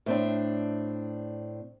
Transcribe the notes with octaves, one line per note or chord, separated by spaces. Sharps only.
A2 C4 D4